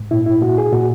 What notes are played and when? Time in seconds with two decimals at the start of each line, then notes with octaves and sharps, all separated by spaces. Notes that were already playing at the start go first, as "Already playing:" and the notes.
Already playing: G#2
0.11 A#2 E4
0.26 E4
0.42 A#2 F#4
0.58 G#4
0.73 A#2 F#4